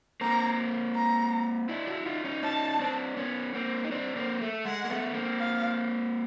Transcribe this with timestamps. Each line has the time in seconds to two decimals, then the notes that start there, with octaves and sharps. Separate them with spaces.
0.21 A#3 C4 A#5
0.95 A#5
1.69 D4 E4
1.87 E4 F#4
2.06 D#4 F4
2.24 C#4 D#4
2.43 C#4 D#4 A5
2.80 C4 D4
3.17 B3 C#4
3.54 A#3 C4
3.84 D#4
3.92 C4 D4
4.16 A#3 C4
4.41 A3
4.65 G#3 F#5
4.84 A#3
4.90 A3 B3
5.14 A#3 C4
5.40 F5